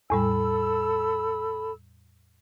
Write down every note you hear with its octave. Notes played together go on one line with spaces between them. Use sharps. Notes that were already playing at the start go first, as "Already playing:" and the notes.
E2 A2 G3 A4 B5 E6